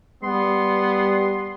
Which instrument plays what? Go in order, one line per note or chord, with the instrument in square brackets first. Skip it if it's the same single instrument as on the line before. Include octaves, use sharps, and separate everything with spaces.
[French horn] G3 [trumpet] B3 [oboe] C6